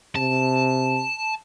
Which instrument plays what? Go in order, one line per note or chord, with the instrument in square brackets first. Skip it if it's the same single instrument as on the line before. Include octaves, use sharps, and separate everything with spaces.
[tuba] C3 [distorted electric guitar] A5